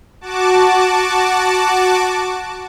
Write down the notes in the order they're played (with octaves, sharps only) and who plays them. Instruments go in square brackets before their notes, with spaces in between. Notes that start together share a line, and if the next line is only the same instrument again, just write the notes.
[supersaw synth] F#4 A5 D6